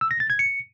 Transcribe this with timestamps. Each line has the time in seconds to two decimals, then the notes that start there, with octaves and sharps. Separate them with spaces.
0.01 E6
0.11 A#6
0.20 A6
0.30 G#6
0.39 C#7